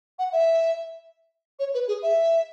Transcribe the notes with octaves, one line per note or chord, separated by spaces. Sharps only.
F#5
E5
C#5
B4
G#4
E5